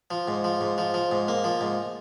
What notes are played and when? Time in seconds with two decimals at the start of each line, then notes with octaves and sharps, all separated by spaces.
0.11 F3
0.28 G#2
0.44 F3
0.61 G#2
0.78 F3
0.94 F3
1.11 G#2
1.28 A#3
1.44 F3
1.61 G#2